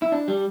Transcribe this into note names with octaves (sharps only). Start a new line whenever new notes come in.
E4
D4
G3